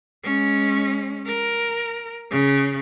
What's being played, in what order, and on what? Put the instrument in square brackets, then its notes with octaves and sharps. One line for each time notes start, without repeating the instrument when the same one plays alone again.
[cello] G#3 C#4
A#4
C#3